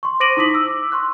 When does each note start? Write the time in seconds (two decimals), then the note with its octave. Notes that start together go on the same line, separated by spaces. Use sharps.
0.03 C6 C#6
0.20 C5 D6 A#6 D7 D#7 F#7
0.37 D#4 E4 D6 D#6 B6 F#7
0.50 D6 E6
0.92 C6 C#6 F#6